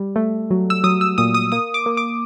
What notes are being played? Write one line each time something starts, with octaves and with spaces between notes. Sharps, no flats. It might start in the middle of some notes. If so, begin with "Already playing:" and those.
Already playing: G3
A3
F#3
E6
F#3 D#6
E6
A#2 D#6
D#6
A#3 D#6
D6
A#3
D6